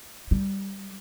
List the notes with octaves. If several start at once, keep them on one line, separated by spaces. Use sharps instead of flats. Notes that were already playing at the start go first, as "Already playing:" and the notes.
G3